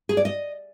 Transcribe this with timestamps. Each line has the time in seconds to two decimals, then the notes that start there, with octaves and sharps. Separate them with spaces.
0.09 G#4
0.17 D5
0.25 D#5